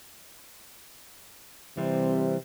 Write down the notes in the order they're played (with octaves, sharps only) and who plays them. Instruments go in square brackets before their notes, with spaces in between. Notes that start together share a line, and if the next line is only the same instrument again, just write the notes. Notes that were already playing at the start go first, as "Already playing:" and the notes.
[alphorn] C3 [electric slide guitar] E3 G3 C4